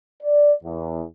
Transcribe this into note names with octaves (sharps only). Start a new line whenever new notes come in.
D5
E2